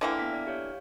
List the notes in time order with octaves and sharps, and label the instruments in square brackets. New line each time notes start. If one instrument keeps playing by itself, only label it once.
[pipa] D3 E3 A#3 [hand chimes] G5
[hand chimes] B3 E5 B6
D5
G4 C#5 F5